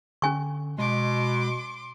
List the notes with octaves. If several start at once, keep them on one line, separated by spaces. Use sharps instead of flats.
D3 C#4 G#5 C#6
B2 G#3 C6 D6